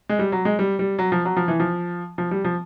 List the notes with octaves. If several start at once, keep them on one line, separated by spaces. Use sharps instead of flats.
G#3
G3
F#3
G#3
G3
G3
F#3
F3
F#3
F3
E3
F3
F3
G3
F3